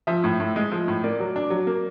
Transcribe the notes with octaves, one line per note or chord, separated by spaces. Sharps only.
F3 E5
A2
A2
G#3
F3
A2
A#3 D5
F#3
D4
F#3
A#3